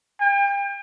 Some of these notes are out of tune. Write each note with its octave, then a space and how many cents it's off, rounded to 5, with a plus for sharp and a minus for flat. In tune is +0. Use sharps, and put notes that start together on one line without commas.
G5 +35